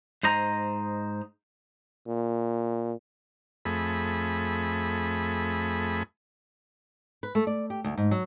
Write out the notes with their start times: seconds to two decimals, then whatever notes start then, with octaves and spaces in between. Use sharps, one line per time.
0.23 G#2 C5 D#5 A#5
2.08 A#2
3.65 F2 A3 G#4 B5
7.23 B4
7.35 A3
7.47 D5
7.70 G4
7.84 D2
7.98 G#2
8.11 F#3